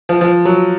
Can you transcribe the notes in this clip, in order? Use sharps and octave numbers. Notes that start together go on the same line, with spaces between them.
F3
F3
F#3